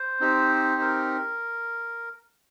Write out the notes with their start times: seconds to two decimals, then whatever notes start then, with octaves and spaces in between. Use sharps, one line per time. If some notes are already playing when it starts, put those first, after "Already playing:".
Already playing: C5
0.20 C4 D#4 G4
0.81 A#4